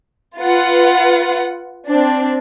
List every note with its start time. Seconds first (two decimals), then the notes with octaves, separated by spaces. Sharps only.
0.38 F4 B4 F#5
1.86 C4 D4